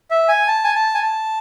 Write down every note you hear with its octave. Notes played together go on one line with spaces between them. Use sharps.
E5
G#5
A5
G#5
A5
G#5
A5